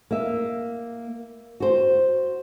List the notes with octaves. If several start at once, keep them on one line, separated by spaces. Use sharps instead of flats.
A#3 E5
F#4 C5